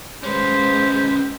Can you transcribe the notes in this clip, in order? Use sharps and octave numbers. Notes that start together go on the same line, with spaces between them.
G#3 C#4 G4 B4 C5